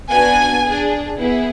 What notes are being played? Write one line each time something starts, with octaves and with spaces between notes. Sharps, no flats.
B3 D4 F#4 G#5
D4 G#4
B3 E4 G#4